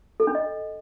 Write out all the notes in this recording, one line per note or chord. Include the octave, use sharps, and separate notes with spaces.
A4
D4
D#5